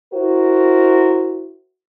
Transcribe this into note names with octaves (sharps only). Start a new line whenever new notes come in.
E4 F#4 A#4 C5